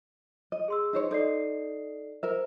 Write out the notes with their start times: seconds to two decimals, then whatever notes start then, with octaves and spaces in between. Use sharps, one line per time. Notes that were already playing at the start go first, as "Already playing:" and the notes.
0.52 D#5
0.68 G#4 C6 E6
0.93 D#4 C5 C#5
1.11 D#4 A4 D5 C7
2.23 A#4 C5 E5